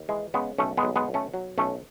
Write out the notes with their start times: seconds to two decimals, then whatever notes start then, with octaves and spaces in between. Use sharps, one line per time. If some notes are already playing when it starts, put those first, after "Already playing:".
Already playing: D#2
0.09 E3 G#3
0.34 C#3 G#3 B3
0.58 B1 A3 C#4
0.77 G#3 B3
0.83 B1
0.96 G#3 B3
1.08 B1
1.14 A3 C#4
1.34 F#3
1.58 B1 A3 C#4